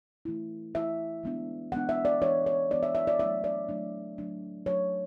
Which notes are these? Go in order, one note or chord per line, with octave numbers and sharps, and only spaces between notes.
E3 A3 E4
E3 A3 E4 E5
E3 G#3 B3 D4
E3 G#3 B3 D4 F#5
E5
D5
E3 G#3 B3 D4 C#5
C#5
E3 G#3 B3 D4 D5
E5
E5
D5
F#3 A3 D4 E5
D5
F#3 A3 D4
F#3 A3 D4
F#3 A3 D4 C#5